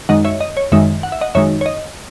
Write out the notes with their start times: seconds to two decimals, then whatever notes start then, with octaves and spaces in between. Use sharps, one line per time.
0.09 F#2 D#3 G#3 D#4 D#5 F#5
0.25 C#5 E5
0.41 D#5
0.57 C#5
0.72 F#2 D#3 G#3 D#4 C#5 E5
1.03 F#5
1.12 E5
1.21 D#5 F#5
1.35 F#2 D#3 G#3 D#4 C#5 E5
1.61 C#5
1.66 D#5